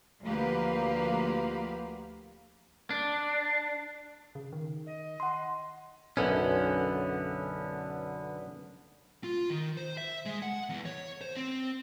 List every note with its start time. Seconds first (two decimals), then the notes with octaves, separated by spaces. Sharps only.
0.23 D2 F3 A#3 G4 B4 F5
2.90 D4
4.35 C#3
4.53 D#3
4.86 D#5
5.20 F#5 C6
6.17 B1 F#2 D3 B3 C#4
9.24 F4
9.50 D#3
9.77 C5
9.97 E5
10.26 G#3
10.42 F#5
10.69 E2
10.85 C#5
11.21 C5
11.36 C4